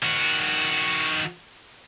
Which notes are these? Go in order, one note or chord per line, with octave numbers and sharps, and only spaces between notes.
D#3 F#4